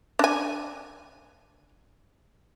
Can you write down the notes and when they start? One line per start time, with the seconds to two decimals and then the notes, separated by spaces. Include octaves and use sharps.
0.19 D4 G#5